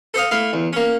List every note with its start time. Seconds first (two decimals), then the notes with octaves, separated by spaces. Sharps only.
0.14 A4 C5 D#5 F5
0.31 A3 E4 F5
0.53 E2
0.73 A#3 C#4